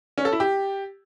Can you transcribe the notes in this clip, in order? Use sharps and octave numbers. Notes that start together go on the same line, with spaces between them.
C#4
A4
E4
G4